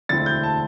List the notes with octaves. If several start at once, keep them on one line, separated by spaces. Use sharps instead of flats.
E1 D2 D3 C4 E4 A6
G6
A5